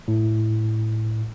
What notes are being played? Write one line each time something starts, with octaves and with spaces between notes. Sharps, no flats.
A2